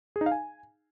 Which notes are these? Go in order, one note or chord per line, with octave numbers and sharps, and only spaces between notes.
G#4
D#4
F5
G#5